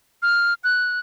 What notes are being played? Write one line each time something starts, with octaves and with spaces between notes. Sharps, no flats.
F6
F#6